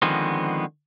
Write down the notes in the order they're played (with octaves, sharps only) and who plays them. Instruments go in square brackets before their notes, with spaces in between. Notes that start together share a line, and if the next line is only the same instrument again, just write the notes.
[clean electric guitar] D3 D#3 F3 G#3 B3 C4